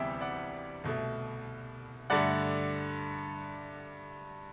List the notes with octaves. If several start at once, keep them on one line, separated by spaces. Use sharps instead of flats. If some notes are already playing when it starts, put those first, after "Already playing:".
Already playing: D2 C3 E3 G3 B3 D5 E5 G5
D5 F#5
C2 B2 A3
G2 D3 A3 D5 F#5